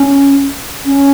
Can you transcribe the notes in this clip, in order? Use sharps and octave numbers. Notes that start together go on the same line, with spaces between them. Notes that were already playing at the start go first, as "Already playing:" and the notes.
Already playing: C#4
C#4